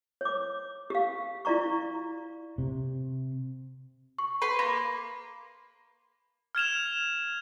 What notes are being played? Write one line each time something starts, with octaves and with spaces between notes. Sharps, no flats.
C#5 D6
G4 F5
E4 F4 D5 A#5 C#6
C3
C#6
B4 C6
A#3 B5
F6 G#6 E7 F7